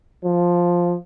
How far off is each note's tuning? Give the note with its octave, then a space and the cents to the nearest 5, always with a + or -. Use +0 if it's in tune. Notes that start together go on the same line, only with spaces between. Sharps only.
F3 +5